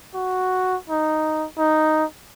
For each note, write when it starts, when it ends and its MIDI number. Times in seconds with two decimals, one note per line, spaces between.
0.14 0.76 66
0.90 1.46 63
1.58 2.04 63